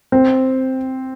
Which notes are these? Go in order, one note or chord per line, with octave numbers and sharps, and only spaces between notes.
C4